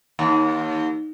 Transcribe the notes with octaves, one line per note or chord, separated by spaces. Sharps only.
D#2